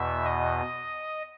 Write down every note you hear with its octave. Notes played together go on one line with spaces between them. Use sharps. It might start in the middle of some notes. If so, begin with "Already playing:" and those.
Already playing: E2 B2 E5
D#5